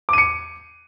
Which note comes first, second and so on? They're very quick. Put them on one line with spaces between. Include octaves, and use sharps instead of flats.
D6 D#7 C#7